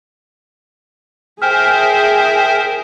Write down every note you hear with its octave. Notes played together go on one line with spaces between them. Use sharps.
G#4 A#4 C5 E5 G5 G#5 F6